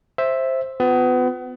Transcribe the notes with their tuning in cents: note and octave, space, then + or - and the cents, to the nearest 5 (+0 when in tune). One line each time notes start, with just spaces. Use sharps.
C5 +10 E5 +0
B3 +30 F4 +10